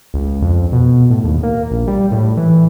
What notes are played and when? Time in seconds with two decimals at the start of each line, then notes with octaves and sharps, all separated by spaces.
0.14 C#2
0.42 F2
0.72 B2
1.10 A2
1.24 D#2
1.43 A#3
1.70 A#1
1.87 G3
2.11 A2
2.37 E3